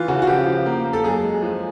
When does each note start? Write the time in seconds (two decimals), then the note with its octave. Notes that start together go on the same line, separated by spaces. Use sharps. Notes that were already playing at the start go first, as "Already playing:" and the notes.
Already playing: E3 F4
0.08 C#3 F#4
0.22 F#4
0.27 F3 G4
0.46 F3
0.66 A#3
0.85 A#3
0.93 A4
1.04 F#2 G#4
1.23 G#3
1.43 F3